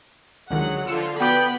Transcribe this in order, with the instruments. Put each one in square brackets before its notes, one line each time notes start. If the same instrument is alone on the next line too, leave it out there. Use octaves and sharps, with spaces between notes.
[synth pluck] C#2 D3 D#3 [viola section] F#3 G#3 F#5
[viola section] D3 F3 F4 [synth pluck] E6 C#7 E7
[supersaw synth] B3 [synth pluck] F#4 D6 D7 [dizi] G5 [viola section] B5